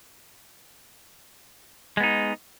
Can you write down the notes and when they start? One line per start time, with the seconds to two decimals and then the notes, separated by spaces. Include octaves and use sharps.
1.97 G#3
2.00 B3
2.03 D#4